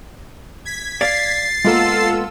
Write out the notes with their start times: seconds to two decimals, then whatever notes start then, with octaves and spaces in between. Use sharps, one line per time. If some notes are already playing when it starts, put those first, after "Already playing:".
0.65 G#6 B6
1.01 D5 F5 A6 C7
1.65 G#3 A#3 B3 F4 A4 E6